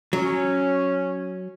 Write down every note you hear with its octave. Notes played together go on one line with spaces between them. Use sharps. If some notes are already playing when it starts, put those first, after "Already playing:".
F#3 C#4